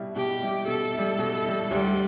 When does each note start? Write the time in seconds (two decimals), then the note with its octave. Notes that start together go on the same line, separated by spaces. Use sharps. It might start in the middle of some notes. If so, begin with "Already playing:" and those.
Already playing: B2 G3 E4
0.16 B2 G4
0.42 G3 E4
0.67 B2 A4
0.93 G3 E4
1.19 B2
1.44 G3 E4
1.70 D2 G3